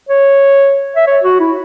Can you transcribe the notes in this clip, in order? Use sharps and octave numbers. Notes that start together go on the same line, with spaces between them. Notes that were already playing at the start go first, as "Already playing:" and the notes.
C#5
E5
C#5
F#4
E4